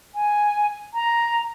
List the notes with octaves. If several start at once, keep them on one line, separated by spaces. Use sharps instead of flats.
G#5
A#5